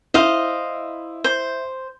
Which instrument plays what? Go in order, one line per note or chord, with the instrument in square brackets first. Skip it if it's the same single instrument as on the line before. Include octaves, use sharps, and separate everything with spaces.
[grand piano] E4 [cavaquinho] C5 D#5 F5
[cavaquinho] C5